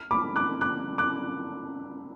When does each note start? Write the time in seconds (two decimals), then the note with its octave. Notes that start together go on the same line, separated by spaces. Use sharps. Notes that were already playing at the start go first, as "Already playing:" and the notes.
Already playing: F6
0.11 B5 D6
0.36 D6 F#6
0.61 D6 F#6
0.98 D6 F#6